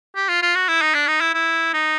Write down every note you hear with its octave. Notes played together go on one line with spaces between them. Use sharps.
G4
F4
F4
F#4
E4
D#4
D4
D#4
E4
E4
D#4